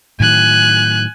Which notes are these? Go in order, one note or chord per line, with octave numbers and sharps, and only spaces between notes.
A2 D#3 F#3 G#5 F#6